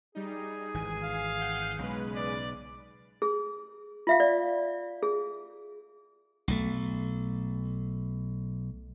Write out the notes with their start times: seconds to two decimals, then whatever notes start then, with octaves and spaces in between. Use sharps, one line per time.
0.15 G3 D#4 G#4
0.74 G#1 E3 G#5
1.04 F5
1.41 F#5 G6 D#7
1.79 B1 C#3 G#3 B4
2.16 D5 D6
3.22 G#4
4.07 F4 E5 F5
4.20 D5
5.03 G#4
6.48 B1 A3